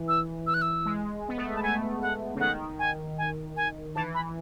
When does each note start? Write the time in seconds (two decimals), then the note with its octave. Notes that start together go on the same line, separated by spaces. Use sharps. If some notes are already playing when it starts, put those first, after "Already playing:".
Already playing: E3
0.08 E6
0.47 E6
0.54 F#6
0.62 E6
0.85 G#3
1.29 B3
1.37 A3
1.56 A5
1.63 A3 G#5
2.02 F#5
2.35 C#3
2.40 D#3 F#5
2.79 G#5
3.18 G#5
3.57 G#5
3.95 E3 A5
4.14 B5